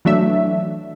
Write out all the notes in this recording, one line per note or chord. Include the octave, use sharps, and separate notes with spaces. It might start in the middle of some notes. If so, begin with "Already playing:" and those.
E3 F#3 A3 D4 E5